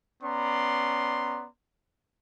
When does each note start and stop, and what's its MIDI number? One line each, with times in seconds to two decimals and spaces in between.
0.23 1.47 59
0.23 1.47 61
0.23 1.47 74
0.23 1.47 82
0.23 1.47 84